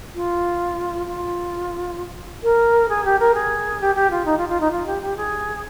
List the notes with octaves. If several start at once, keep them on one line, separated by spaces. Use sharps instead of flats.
F4
F4
A#4
G#4
G4
A#4
G#4
G4
G4
F4
D#4
F4
F4
D#4
F4
G4
G4
G#4